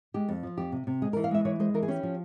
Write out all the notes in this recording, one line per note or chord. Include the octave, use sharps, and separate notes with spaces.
G#3 G4
F2
F3
F2 G4
C3
C3
G#3 G#4
A#4
E3
F5
G#3 E5
E3 C#5
G#3 C5
E3 A#4
G#4
C#4 G4
F3